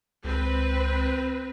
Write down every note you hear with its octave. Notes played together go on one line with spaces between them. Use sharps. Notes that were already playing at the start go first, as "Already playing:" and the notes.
C#2 C4 B4